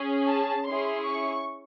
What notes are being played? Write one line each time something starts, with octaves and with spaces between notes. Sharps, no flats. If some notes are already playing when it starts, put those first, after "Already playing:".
Already playing: C#4 G#4
A5
C#4 E4 G#4 C6
C#6